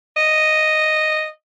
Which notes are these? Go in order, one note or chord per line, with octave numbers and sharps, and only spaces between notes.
D#5